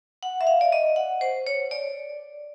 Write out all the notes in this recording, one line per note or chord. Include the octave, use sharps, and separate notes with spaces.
F#5
E5
F5
D5
D#5
F#5
C5
C#5
D5